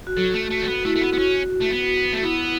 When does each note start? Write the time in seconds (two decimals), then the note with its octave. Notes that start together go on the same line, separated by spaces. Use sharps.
0.07 F#4
0.17 F#3 A4
0.34 A3
0.51 A3
0.63 C#4
0.68 B3 F#4
0.85 A3 E4
0.96 A3
1.02 B3 F#4
1.13 B3
1.19 C#4 F#4
1.62 A3
1.72 B3
2.13 A3
2.23 B3 E4